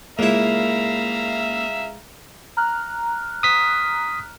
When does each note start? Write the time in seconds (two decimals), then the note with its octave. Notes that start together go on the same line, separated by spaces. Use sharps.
0.19 C#2 A#3 E4 E5 F5 A#5
2.57 A#5 F6 F#6
3.43 D#6 B6